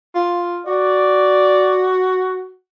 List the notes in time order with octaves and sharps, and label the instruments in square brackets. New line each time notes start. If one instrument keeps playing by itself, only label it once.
[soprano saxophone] F4
[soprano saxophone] F#4 [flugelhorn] D5